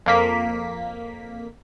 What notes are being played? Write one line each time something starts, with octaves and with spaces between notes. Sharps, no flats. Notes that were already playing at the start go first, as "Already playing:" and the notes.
F2 A#3 B6